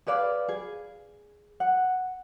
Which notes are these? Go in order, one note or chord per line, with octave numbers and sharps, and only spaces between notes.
G#4 B4 D5 F5
G#4
F#5